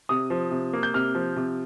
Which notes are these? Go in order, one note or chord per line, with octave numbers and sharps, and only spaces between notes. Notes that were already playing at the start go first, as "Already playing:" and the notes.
C3 D#6
F3
C3
A#3
G6
C3 F6
F3
C3